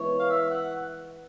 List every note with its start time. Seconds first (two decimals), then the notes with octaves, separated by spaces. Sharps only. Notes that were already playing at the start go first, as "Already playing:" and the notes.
Already playing: E3 G#3 B3 C#5
0.19 F5
0.29 E5
0.50 F#5